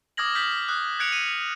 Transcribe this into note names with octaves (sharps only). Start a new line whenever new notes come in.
D6 D#6 F6 G#6 A#6 F#7
F6 G6 B6 F#7
D#6 F#6
F#6 G#6 C#7 D7 F7
D#7